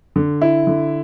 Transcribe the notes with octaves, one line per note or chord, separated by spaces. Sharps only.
D3
E4
D3